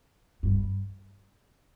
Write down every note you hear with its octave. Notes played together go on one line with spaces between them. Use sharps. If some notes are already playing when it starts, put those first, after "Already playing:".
G2